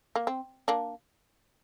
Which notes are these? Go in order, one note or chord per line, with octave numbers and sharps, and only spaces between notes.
A#3
C4
A#3 D4